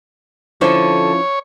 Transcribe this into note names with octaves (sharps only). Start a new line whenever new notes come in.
D3 F3 C#4 E4 A4 C5 C#5